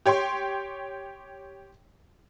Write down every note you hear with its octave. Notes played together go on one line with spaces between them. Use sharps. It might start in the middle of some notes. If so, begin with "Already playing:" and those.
G4 C#5 G5 C6